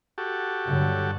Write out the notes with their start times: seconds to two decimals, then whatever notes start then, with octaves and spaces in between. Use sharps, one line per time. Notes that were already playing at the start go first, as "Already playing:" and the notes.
0.18 F#4 G4 A4
0.66 G2 D3 F#3